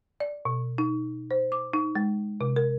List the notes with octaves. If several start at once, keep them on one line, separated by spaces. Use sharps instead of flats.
D5
B2
D#4
C5
D6
D#4
G#3
C3
A#4